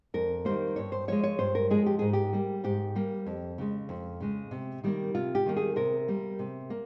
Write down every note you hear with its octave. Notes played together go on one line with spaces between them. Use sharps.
F2 A#4
D#3 G3 A#3 C5
G2 C#5
C5
F3 G#3 C#5
C#5
G2 C5
A#4
F3 G#3 G#4
G4
G#2 G#4
G4
G3 A#3
G#2 G4
G3 A#3
F2
C#3 G#3
F2
C#3 G#3
C3
D#3 G3 A#3
C3 F4
G4
D#3 G3 A#3
G#4
C3 A#4
G3 A#3
C3
A#3